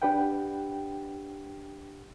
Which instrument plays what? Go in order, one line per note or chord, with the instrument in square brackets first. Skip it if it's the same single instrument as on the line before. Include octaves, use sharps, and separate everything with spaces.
[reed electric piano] D4 G4 B4 F#5 G5